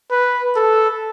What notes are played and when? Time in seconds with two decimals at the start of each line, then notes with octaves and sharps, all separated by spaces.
0.11 B4
0.56 A4